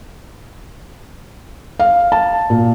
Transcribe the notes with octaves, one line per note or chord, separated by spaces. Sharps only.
F5
A5
A#2